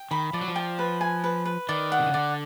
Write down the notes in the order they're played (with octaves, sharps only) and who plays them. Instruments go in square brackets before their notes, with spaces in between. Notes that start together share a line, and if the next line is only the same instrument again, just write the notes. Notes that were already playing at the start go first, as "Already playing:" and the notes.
Already playing: [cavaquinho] G5
[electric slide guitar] D#3 [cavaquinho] B5
[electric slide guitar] F3 [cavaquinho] D5
[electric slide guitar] F#3
F3
[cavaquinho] G5
B4
G#5
B4
B4
[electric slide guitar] D#3 [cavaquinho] D5
[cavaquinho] F#5
[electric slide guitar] C3
C#3
[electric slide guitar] D3 [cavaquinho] D5